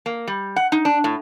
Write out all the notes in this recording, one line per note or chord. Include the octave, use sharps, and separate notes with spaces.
A#3
G3
F#5
D#4
D4
A2